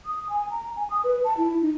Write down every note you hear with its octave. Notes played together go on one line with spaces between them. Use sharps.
D#6
G#5
A#5
G#5
D#6
B4
A5
E4
D#4